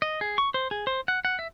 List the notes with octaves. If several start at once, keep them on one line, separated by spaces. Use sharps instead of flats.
D#5
G#4
C#6
C5
G#4
C5
F#5
F#5
E5